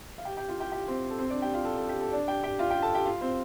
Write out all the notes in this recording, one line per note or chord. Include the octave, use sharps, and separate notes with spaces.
F5
G4 G5
G4 G5
F4 F5
G4 G5
G4 G5
C4 C5
A4
C4 C5
D4 D5
G4 G5
F4 F5
A4
A4
G4
A4
D4 D5
G4 G5
G4 G5
F4 F5
G4 G5
A4 A5
G4 G5
F4 F5
C4 C5